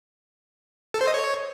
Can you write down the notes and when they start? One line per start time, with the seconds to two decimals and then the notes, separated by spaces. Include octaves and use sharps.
0.94 A4
1.01 C5
1.07 D#5
1.14 C#5